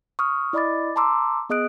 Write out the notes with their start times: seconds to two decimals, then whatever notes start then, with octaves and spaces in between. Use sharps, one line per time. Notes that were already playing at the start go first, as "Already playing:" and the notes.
0.19 C#6 D#6 F6
0.53 E4 D5 D#5 B5 D6 A6
0.96 A5 A#5 C6 D6 E6
1.50 B3 G#4 D#5 D#6 F#6 D7